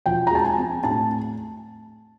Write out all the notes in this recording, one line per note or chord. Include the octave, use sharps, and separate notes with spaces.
F3 G5
A#5
G#3 A5
G#5
C4
A2 A5